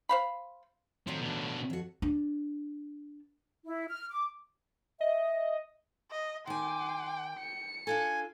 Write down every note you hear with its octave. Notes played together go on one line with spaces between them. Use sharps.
C5 F5 B5
A2 D#3 F3 F#3 C4
B2 D4
F2 F#4
D4
E4
F6
D6
D#5 E5
D#5
D#3 G5 G#5 C6 D6
C#7
D4 F4 A4 G#5